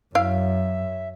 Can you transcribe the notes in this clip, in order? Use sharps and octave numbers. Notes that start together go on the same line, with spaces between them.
F#2 E4 E5 F5